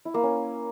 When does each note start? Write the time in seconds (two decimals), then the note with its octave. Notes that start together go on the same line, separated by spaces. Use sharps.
0.05 E4
0.14 A#3
0.23 C#4